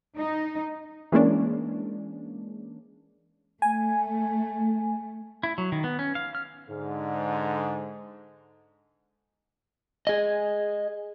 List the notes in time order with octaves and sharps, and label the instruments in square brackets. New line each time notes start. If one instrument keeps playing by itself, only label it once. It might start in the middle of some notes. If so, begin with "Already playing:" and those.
[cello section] D#4
[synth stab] E3 G#3 A#3 C#4 D4
[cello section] A3 [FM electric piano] G#5
[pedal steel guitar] E4
F#3
D#3
B3
C#4
F5
F6
[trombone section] G#2 D3
[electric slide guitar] G#4 D#5